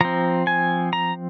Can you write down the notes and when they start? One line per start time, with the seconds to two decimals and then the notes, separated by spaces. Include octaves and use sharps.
0.01 F3 C4 A#5
0.47 G#5
0.93 A#5